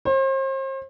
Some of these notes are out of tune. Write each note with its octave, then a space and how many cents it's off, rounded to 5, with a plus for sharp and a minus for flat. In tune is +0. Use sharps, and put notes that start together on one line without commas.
C5 +40